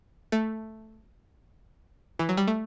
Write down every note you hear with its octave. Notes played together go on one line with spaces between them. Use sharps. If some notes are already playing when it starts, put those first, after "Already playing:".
A3
E3
F#3
G3
A3